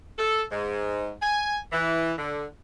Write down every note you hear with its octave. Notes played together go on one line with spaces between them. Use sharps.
A4
G#2
G#5
E3
D3